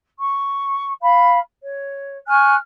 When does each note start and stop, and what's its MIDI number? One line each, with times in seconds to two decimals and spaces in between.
0.18 0.92 85
1.01 1.39 77
1.01 1.39 83
1.61 2.17 73
2.28 2.54 80
2.28 2.54 85
2.28 2.54 89
2.28 2.54 90